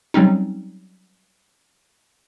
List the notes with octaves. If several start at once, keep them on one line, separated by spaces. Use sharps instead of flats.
F#3 G3 C4 C#4 D#4